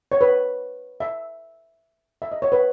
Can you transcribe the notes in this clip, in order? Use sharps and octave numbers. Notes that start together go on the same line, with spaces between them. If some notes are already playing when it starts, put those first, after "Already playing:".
C#5
B4
E5
E5
D#5
C#5
B4